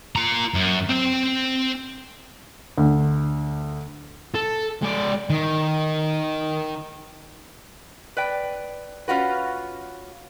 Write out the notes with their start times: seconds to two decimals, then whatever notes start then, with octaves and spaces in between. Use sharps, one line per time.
0.16 F4 A#5
0.54 F#2
0.89 C4 G5
2.78 D2
4.34 A4
4.83 G#3 D5
5.30 D#3
8.17 B4 D5 G5
9.08 C#4 F4 F#4 B4